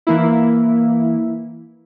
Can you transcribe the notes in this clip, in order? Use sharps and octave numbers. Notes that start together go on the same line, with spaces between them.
E3 A#3 E4